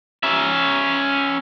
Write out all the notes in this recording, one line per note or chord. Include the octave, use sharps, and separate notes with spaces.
C#4 E5